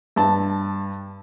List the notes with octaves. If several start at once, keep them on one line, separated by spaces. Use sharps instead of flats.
G2 A5